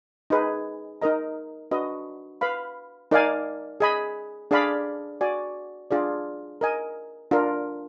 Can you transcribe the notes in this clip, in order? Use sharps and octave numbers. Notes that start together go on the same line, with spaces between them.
D#4 G#4 B4
D#4 A#4 D#5 A#5
D4 F#4 B4 D#5
B4 F5 B5
D#4 A#4 D5 F5 G#5
G#4 D#5 G#5 B5
D4 G#4 D5 F5 B5
F#4 D5 G#5
D4 F4 G#4 D5
A#4 D#5 G#5
D4 F4 A#4